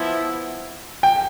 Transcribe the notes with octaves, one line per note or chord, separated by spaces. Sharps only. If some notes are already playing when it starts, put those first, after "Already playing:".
Already playing: F3 B3 E4
G5